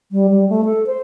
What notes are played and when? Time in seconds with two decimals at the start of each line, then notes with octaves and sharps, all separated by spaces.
0.12 G3
0.30 G3
0.49 A3
0.65 A4
0.86 C5